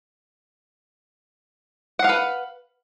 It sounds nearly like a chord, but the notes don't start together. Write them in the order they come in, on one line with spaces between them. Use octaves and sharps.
F#5 F5 B4